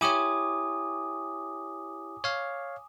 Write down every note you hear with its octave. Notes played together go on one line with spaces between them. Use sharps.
E4 G4 C#5 G#5 D6 D#6
C#5 F5